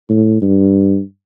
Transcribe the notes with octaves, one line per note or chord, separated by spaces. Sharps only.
A2
G2